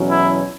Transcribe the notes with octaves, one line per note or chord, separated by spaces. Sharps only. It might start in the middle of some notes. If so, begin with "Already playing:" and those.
Already playing: E2 B2 F#3 C#4
E4